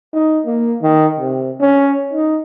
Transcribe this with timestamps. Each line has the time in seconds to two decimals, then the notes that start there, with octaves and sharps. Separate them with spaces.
0.13 D#4
0.46 A#3
0.82 D#3
1.20 C3
1.60 C#4
2.13 D#4